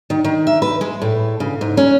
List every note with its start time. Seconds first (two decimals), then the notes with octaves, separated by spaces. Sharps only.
0.10 D#3
0.24 D#3
0.47 E5
0.62 B4
0.81 G#3
1.02 A2
1.40 C#3
1.61 G#2
1.77 C#4